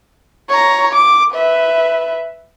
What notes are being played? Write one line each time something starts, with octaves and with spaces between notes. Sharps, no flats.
C#5 A#5
D6
B4 E5